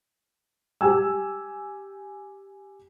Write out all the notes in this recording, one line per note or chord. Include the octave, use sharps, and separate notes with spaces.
G4 G#5 E6